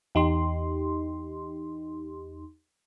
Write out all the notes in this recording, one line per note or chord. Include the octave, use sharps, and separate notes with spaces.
E2 D#4 G4 C6